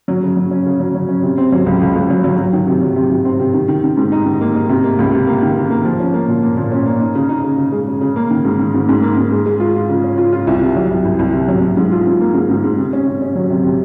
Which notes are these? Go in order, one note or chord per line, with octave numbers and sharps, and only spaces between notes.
F#3
C#3
F#3
C#4
C#3
F#3
F#3
C#4
C3
C4
F#3
C#2
C#2
C#2
F#3
F#3
F#3
D#3
C3
F#3
C3
C3
C4
C3
D#3
D#3
D#3
G#2
D#4
D#3
A#3
D#4
C3
A#3
C#2
C3
A#3
D#3
D#3
A#3
F3
C#4
A#3
A#2
A#3
A#2
C#4
A#3
D#4
C#3
D#4
C#3
C#3
G#3
C#3
C#3
A#3
D#3
G#2
D#3
G#2
G#2
A#3
G#2
G#3
G#3
F4
F4
C#3
C#4
F4
F4
C2
C3
F#3
C2
C2
C2
C3
F#3
F#3
G#2
F4
G#2
A#3
G#2
G#2
G#2
C3
C#4
C3
C#4
F#3
C3
C3